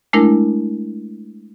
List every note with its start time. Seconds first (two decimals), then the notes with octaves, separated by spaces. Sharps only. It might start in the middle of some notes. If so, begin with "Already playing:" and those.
0.13 G#3 A3 D4 E4 A#4